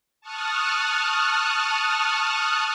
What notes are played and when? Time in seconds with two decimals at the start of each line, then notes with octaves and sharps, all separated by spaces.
0.21 A5 C#6 D#6 F6 F#6